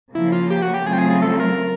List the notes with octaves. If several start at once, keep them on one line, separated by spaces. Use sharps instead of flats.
C#3 F3 A#3 E4
F4
G4
F#4
G4
C#3 F#3 A3 C4 F4 G#4
G4
G#4
G#4
A4
A#4